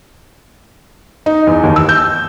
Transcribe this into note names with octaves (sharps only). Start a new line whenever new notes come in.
D#4
E2
D#2
E6
G6